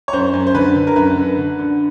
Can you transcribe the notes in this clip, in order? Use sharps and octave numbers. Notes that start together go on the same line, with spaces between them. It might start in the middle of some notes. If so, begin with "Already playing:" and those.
C#5
F#2 C5
F#2
C5
D3 B4
D3
A#4
F#2 B4
D3
D3
D3